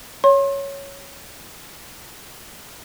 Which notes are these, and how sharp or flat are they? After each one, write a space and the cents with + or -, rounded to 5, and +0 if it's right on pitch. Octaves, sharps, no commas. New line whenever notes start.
C#5 +0 C6 +40